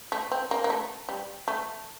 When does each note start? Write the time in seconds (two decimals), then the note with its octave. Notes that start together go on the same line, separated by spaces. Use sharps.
0.12 A3
0.32 C4
0.51 A#3
0.64 A#3
0.70 A3
1.09 G3
1.48 A3